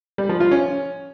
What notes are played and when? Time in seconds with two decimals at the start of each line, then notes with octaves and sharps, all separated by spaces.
0.18 G3
0.29 F3
0.40 F4
0.51 C#4